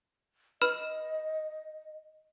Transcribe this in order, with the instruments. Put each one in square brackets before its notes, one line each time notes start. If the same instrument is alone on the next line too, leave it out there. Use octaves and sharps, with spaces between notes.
[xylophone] B4 B5 F6 [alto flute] D#5